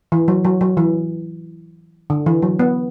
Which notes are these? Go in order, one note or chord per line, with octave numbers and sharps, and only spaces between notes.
E3
F#3
F#3
F#3
E3
D3
E3
F#3
B3